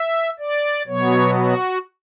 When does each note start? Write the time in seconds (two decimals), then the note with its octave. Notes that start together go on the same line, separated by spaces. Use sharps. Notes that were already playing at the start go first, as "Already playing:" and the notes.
Already playing: E5
0.39 D5
0.87 B2 F#3 B3 C#5
1.35 F#4